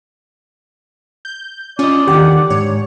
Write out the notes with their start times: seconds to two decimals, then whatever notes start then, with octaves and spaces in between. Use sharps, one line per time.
1.25 G6
1.79 C#4 F4 D5 D#5
2.07 D#2 D3 D#3 G4 F#5
2.50 G#2 C#5